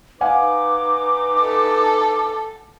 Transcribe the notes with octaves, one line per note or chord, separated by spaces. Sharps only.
D#4 B4 F5 F#5 G#5 D6
A4